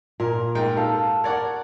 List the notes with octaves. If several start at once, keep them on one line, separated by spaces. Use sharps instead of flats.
A#2 A#4
G#2 A#4 G5
A4 F5
A#4 C#5 D5 F#5